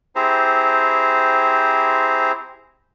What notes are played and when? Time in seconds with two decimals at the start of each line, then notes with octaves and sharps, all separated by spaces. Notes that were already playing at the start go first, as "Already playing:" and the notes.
0.16 C4 E4 G4 G#4 C5 A#5